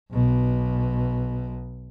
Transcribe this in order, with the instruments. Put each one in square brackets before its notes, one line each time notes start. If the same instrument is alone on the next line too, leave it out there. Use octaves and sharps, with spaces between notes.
[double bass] B1 B2